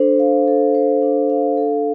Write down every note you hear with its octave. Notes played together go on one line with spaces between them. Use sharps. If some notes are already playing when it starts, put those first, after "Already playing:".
Already playing: D4 A4 C5
F5
A4
C5
D4
F5
A4